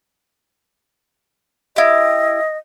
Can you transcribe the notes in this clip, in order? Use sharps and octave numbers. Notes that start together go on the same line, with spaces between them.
E4 G4 D#5